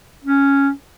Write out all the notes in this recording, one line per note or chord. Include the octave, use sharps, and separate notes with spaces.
C#4